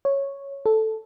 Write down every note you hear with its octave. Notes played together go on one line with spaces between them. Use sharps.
C#5
A4